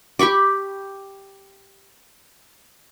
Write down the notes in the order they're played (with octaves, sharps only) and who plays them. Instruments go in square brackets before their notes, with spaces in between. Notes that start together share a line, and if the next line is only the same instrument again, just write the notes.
[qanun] G4 B5 C#6 D6